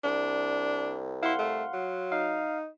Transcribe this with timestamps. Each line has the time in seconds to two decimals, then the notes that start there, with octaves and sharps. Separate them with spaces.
0.04 C2 D4
1.23 E4 F5 F#5 C6
1.39 A3
1.73 F#3
2.12 D#4 F5